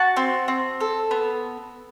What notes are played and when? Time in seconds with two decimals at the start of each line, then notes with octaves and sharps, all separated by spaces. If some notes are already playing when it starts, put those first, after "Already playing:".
Already playing: F#4 A5
0.16 C4
0.48 C4
0.80 A4
1.11 B3